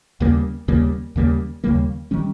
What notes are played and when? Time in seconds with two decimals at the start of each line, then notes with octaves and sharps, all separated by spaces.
0.20 D#2 C#3 G3 A#3
0.68 D#2 C#3 G3 A#3
1.16 D#2 C#3 G3 A#3
1.64 D#2 C#3 G3 A#3
2.11 D#3 G3 C#4